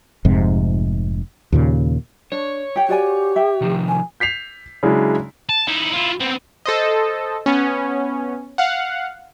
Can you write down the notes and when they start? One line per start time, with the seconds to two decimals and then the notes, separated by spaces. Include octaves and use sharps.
0.25 F1 F2 G#2 C3
1.52 D#2 A#2 C#3
2.32 D4 C#5
2.76 G4 G5
2.89 F#4 G4 D5 G#5
3.36 E5 G5
3.61 C3 D#3 F3
3.88 G#5
4.20 G6 B6 C7 F7
4.83 C#3 F#3 G#3 D4 E4
5.49 A5
5.68 D#4 E4
5.93 E4 F4
6.20 B3 C4
6.66 A4 C5 D#5
7.46 B3 C#4
8.58 F5 F#5